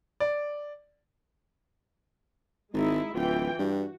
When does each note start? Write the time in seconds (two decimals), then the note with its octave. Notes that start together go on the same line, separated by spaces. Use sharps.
0.20 D5
2.74 G#1 G#3 D#4 E4
3.15 D1 E3 F4 G5
3.59 G2 F#4